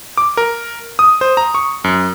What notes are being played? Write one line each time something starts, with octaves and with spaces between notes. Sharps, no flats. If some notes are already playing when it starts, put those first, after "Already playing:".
D6
A#4
D#6
C5
A#5
C#6
F#2